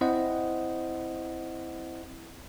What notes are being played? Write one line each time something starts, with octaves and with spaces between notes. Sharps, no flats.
C4 E4 C5 D#5 F#5